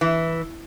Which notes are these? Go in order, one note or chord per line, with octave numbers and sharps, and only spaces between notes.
E3